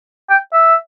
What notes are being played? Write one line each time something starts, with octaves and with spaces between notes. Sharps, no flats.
G5
E5